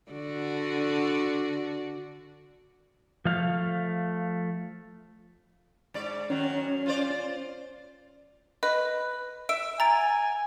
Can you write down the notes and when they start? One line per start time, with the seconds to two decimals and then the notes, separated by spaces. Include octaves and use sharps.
0.11 D3 F#4 D5
3.25 F3 A3 F5
5.94 G#2 D5
6.30 D#3 F#3 C#4
6.86 F4 C5 D5
8.63 B4 D#5
9.49 E5 D7
9.80 G#5 A#5 A6 D7